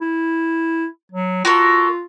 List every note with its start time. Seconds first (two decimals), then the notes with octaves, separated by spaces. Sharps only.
0.01 E4
1.12 F#3
1.45 F4 F#4 A4 A#4